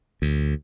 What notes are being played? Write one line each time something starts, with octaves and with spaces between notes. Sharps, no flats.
D2